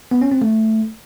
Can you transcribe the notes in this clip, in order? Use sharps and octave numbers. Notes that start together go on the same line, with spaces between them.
B3
C#4
C4
A3